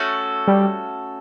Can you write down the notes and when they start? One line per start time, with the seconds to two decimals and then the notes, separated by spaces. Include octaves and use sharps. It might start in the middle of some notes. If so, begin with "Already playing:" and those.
Already playing: A3 C#4 F#4 A4
0.48 G3